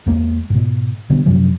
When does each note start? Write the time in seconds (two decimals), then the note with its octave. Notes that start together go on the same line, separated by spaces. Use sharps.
0.06 E2 G#3 A#3
0.50 G#2 B2
1.10 B2 D3 G3 B3
1.26 F#2 C3 F3 F#3